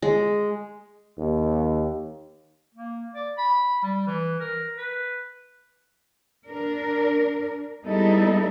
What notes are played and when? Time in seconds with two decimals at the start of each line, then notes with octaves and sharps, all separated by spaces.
0.02 G#3
1.18 D#2
2.75 A#3
3.15 D5
3.38 B5
3.83 G3
4.07 E3
4.40 A#4
4.78 B4
6.47 D4 A#4
7.84 G3 G#3 B3 D#4 E4 A4